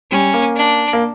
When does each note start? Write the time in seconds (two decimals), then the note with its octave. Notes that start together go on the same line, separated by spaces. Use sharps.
0.11 G3 C#4
0.34 A#3
0.56 D4
0.93 A#3